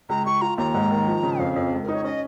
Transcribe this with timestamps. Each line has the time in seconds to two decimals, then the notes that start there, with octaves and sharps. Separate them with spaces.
0.09 C#2 A#5
0.25 C#2 C#6
0.41 F4 A#5
0.58 D#2 A#5
0.74 G#2
0.91 D#3
1.07 F3
1.23 C#3
1.39 F2 F5
1.56 F2
1.72 C#2
1.83 A#4
1.89 D#4 C#5
2.04 C#4 D#5